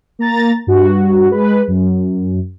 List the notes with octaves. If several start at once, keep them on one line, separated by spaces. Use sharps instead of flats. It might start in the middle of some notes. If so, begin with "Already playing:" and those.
A#3 A#5 A6
G2 F#4
G#3 B4
F#2